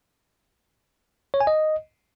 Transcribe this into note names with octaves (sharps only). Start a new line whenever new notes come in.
C#5
G#5
D#5